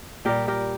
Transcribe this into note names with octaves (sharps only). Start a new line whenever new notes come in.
A#2 G3 G4 A#4
G4 A#4